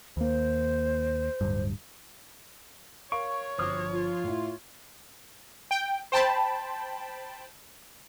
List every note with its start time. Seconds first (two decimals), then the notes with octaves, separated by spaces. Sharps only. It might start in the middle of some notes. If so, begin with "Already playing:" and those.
0.17 D#2 A#3 C5
1.41 D1 G2
3.12 A#4 C#5 F5 C#6 D7
3.59 G1 F3 C4 F#4 C5 D6 D#6 F6
3.93 F4
4.24 A2 E4
5.71 G5
6.12 C5 G5 A5 B5